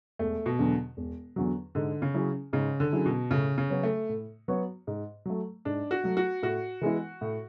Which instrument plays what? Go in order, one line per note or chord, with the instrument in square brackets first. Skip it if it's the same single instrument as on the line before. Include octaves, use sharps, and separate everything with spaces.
[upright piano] E1 [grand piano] A3
[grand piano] B2
[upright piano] E2 D3 F#3
E1
E2 D3 F#3
[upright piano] G#2 [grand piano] D3
[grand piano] C#3
[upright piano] F#3 C#4 E4 G#4
[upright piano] G#2 [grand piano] C#3
[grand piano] D3
[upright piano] F#3 C#4 E4 G#4
[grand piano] B2
[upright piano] A2 [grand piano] C#3
[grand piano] C#3
[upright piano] F#3 B3 F#4 C#5
[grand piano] A3
[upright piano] A2
F#3 B3 F#4 C#5
G#2
F#3 A3
[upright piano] G#2 [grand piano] D4
[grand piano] F#4
[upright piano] F#3 A3
[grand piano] F#4
[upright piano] A2 [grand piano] F#4
[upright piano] E3 G#3 B3 E4
A2